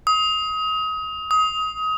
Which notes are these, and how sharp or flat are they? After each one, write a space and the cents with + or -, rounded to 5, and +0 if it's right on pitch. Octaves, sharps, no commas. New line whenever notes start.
D#6 +30
D#6 +25